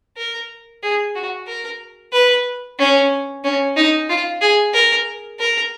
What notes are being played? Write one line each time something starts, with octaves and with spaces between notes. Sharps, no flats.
A#4
G#4
F#4
A#4
B4
C#4
C#4
D#4
F4
G#4
A#4
A#4